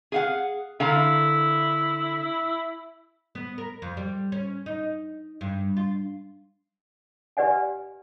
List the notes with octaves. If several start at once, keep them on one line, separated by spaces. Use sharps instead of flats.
G#4 F5 F#5
D3 E4 F5 A#5
B3
A#4
F2
G3
C#4
D#4
G2
F4
G4 B4 D5 F#5 G#5